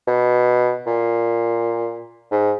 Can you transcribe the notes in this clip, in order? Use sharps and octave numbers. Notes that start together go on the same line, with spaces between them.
B2
A#2
G#2